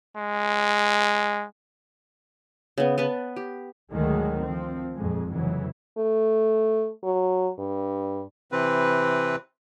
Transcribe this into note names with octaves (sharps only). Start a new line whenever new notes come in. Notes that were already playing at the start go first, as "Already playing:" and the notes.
G#3
C#3 B3
B3 B4 A5
G4
D2 G#2 D#3 F#3 G#3
F3 C4
A#1 F2 G#3
F1 F2 C#3 E3 F#3
A3
F#3
G2
C3 E3 C4 B4